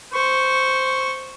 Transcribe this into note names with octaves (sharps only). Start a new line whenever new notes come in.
C5 C#6